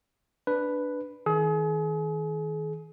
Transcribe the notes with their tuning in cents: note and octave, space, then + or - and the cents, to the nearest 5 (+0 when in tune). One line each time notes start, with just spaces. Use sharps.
D4 +0 B4 +0
D#3 +35 G#4 +35